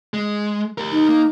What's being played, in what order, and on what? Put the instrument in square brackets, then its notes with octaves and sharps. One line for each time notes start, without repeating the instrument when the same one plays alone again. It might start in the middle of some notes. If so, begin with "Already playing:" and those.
[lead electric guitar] G#3
G4 A#4
[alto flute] D#4
[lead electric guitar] A#3